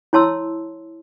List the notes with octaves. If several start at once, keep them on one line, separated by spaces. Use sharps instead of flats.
E4 C#5 A5 C6 E6